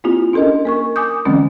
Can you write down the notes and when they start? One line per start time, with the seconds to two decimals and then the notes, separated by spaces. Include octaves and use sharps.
0.04 A#3 C4 E4 F4 G4
0.33 C#4 D4 A4 A#4 D#5
0.65 A#3 A#4 C#6
0.96 G#5 D6 D#6 G6
1.25 D3 E3 F3 G#3 C4 C#4